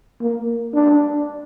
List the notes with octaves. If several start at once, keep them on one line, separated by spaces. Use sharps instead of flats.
A#3
D4